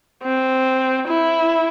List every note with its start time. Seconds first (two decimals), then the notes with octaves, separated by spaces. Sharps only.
0.23 C4
1.08 E4